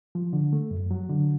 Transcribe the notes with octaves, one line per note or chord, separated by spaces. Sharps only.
F3
D3
A3
F#2
F#3
D3